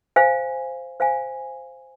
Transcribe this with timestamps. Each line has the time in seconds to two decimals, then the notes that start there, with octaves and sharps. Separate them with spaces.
0.16 C5 F5 G#5
1.00 C5 F5 G#5